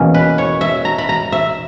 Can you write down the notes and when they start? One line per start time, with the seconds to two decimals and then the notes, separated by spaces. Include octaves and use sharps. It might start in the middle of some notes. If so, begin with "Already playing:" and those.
Already playing: E2 B2 A#3 C#4
0.14 B4
0.38 C#5
0.61 E5
0.85 A#5
0.98 B5
1.09 A#5
1.32 E5